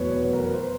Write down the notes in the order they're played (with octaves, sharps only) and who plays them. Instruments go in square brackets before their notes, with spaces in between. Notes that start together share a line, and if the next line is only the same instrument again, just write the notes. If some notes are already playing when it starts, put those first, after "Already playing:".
Already playing: [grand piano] F1 E2 B2 F#3 B3 B4 C#5
A#4
B4
C5